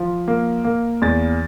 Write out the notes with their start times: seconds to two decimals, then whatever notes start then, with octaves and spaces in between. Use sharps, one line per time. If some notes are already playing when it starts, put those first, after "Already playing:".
Already playing: F3
0.28 A#3
0.64 A#3
1.02 E2 A6